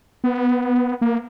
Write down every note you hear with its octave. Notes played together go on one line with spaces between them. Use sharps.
B3
A#3